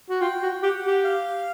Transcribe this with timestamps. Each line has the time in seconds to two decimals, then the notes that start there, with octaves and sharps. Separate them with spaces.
0.10 F#4
0.21 F4 G5
0.42 F#4
0.63 G4 F#5
0.84 G4
1.04 F5